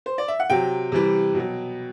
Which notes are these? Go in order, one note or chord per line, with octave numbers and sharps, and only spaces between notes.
C5
D5
E5
F#5
C3 F#3 G5
C3 E3 G3
B2 F#3